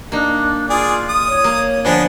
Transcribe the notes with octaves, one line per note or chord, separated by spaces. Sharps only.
A#3 D4 D#4
F4 G#4 D5
D#6
C#5
A#3
D3 F3 B3 D4 G#5